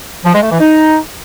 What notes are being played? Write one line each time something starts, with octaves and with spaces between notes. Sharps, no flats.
F3
G#3
A3
E3
D#4